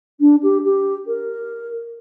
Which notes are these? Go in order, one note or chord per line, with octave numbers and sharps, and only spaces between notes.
D4
G4
G4
A#4